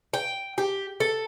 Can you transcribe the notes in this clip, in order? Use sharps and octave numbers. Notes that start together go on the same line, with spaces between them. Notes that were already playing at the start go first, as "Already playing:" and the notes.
G5
G4
A4